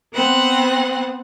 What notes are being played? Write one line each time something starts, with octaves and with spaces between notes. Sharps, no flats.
B3 C4 F#5